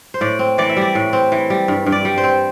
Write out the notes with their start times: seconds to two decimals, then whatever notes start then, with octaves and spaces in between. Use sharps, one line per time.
0.14 C5
0.21 A2 D5
0.39 C4
0.58 E3 D5
0.69 E5
0.77 G3 D5
0.95 A2
1.13 C4
1.32 E3
1.50 G3
1.68 G2
1.86 G2
1.92 D5
2.05 G3
2.18 C5
2.24 C4